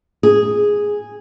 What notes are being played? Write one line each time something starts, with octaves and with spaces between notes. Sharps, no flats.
G#4